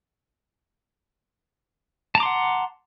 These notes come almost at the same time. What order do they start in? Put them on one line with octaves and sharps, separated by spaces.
A5 A#5 D6 C6 F#5